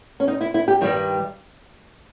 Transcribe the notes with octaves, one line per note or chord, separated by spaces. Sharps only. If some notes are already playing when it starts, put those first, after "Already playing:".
C#4
D#4
E4
E4
G4
G2 D#3 G3